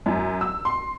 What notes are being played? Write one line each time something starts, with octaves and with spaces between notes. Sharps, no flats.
F#2
E6
C6